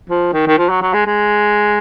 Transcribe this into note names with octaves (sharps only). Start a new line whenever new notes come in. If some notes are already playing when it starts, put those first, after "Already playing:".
F3
D#3
D#3
F3
F#3
F#3
G#3
G#3